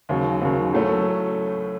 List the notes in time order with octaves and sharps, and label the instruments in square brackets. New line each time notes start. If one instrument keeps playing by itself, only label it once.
[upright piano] D#2 C#3 F#3
D#2 C#3 F#3
A2 F#3 A3 C#4